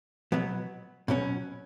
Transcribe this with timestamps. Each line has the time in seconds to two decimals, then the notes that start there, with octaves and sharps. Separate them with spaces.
0.32 B2 F#3 B3
1.08 B2 F#3 C#4